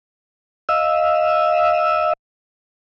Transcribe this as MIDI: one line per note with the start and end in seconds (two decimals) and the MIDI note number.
0.69 2.13 75
0.69 2.13 77
0.69 2.13 88